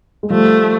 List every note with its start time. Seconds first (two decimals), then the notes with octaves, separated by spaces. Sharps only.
0.23 G#3
0.30 F3 G3 A3